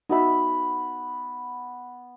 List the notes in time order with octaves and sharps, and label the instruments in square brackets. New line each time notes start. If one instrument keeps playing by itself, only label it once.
[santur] B3 B5 [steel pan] D#4 F#4 E5